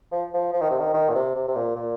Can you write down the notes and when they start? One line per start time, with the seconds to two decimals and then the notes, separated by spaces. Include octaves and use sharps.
0.12 F3
0.34 F3
0.53 F3
0.61 D#3
0.70 C3
0.80 D#3
0.94 D#3
1.09 A#2
1.15 C3
1.35 C3
1.48 C3
1.56 A#2
1.76 A#2